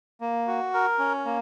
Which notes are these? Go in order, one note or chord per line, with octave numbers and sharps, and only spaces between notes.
A#3
F#4
A#4
C#4
A#3